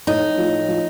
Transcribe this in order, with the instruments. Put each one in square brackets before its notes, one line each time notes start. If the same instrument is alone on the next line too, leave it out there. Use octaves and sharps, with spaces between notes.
[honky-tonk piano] A2 [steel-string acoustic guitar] D#4
[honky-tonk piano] F3
F3